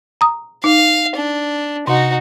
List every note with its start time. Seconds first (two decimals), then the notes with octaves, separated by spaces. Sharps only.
0.21 A#5 D#6
0.64 D#4 F5
1.16 D4
1.87 C3 D#4 F#4